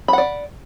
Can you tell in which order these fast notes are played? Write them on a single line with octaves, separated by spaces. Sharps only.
B5 F#5 D5